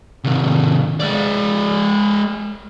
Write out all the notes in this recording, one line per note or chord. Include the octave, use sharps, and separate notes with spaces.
C3 D#3
G#3 D5